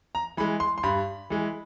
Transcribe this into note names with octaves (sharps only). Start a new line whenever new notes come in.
A#5
E3 G#3 B5
C6
C6
G2 B5
E3 G#3